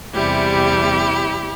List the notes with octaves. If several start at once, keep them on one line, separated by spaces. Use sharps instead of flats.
E2 C3 G3 E4 G4